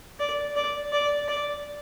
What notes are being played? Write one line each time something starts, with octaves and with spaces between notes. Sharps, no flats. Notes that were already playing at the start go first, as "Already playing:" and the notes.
D5
D5
D5
D5